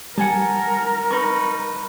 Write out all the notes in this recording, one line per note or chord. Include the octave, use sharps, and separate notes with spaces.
G3 A#4 F#5 G#5 A5
D#4 B4 C#6